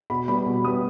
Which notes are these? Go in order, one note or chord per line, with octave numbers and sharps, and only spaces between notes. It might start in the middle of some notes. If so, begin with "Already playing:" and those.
B2 B5
G3 B3 B5
B2
G3 B3 D#6